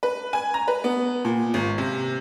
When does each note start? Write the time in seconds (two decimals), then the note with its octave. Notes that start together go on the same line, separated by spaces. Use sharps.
0.03 B4
0.33 G#5
0.54 A#5
0.68 B4
0.84 B3
1.25 A#2
1.54 G#1
1.78 C3